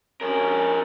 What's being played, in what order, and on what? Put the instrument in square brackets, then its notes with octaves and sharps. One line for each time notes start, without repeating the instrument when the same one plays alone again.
[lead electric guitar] F2 A#4 [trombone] C#4